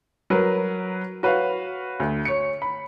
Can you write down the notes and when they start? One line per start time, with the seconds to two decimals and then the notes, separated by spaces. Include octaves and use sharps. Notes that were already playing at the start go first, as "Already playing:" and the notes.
0.30 F#3 A#4 B4
1.23 F#4 B4 C#5 F5
2.00 D2
2.25 C#5 C#7
2.62 B5